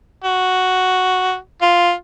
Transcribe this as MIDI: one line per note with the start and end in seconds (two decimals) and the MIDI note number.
0.24 1.35 66
1.62 1.92 65